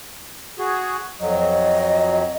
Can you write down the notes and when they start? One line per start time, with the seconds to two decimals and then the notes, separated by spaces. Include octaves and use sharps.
0.59 F#4 G#4
1.20 F2 F#3 D#5